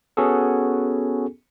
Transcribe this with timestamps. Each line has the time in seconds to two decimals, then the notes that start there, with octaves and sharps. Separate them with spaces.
0.17 B3 C#4 F#4 G#4 A4